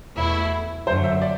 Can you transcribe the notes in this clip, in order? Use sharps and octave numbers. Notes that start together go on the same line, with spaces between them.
E2 B2 A3 E4
F#2 D3 F#3 C5
E5
D5